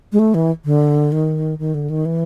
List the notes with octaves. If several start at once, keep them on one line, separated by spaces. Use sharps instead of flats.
G#3
A3
E3
D3
D#3
D#3
D3
D#3
E3